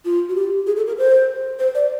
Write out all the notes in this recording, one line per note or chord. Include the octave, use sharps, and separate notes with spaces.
F4
F#4
G4
G#4
A4
A#4
C5
C5
D5